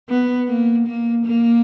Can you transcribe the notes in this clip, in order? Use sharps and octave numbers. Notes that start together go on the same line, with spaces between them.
B3
A#3
A#3
A#3